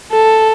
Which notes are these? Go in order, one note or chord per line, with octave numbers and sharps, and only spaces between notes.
A4